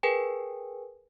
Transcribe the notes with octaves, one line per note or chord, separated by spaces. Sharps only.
G#4 A#4 B4 G5 G#5